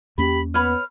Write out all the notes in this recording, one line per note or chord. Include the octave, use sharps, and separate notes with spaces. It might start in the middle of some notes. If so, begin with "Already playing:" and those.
E2 A#3 C#4 G4 B5
B3 B4 C#5 B5 F6